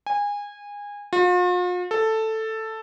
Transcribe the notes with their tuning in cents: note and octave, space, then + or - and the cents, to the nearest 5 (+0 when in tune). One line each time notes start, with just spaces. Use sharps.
G#5 -25
F4 +45
A4 +5